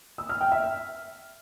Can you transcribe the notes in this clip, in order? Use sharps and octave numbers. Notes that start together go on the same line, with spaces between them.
E6
F6
G5
E5